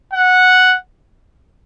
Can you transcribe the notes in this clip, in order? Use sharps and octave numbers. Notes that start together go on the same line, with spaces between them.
F#5